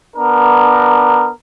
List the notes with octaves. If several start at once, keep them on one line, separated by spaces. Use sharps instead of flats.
B3 D4 A#4